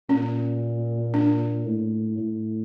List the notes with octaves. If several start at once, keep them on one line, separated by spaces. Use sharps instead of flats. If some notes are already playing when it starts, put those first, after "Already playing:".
A#2 C#4
D4
A2
A2